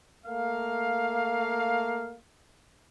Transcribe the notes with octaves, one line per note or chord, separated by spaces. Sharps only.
A3 A#3 F5